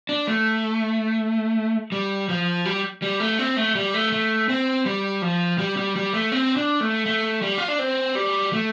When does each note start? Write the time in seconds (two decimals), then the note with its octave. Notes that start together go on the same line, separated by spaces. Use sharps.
0.09 D4
0.27 A3
1.92 G3
2.29 F3
2.65 G3
3.02 G3
3.20 A3
3.39 C4
3.57 A3
3.75 G3
3.94 A3
4.12 A3
4.49 C4
4.86 G3
5.22 F3
5.58 G3
5.77 G3
5.96 G3
6.13 A3
6.32 C4
6.57 D4
6.81 A3
7.06 A3
7.42 G3
7.58 F4
7.68 D4
7.79 C4
8.15 G3
8.53 A3